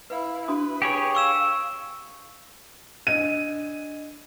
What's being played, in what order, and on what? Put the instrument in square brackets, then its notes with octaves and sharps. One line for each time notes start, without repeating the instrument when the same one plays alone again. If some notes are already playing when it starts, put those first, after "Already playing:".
[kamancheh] E4 F5 [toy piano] B4
[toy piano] D4 F#4 D#6 [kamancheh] B4
[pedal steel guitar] G4 G#4 C#5
[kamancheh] F5 [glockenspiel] C#6 E6 E7
[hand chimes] D4 D#5 G#6 [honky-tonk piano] D#7